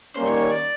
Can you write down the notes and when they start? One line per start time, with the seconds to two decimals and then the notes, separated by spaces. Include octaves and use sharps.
0.15 D#3 G3 A#3 C#4 C5
0.27 C#5
0.38 C#5
0.51 D5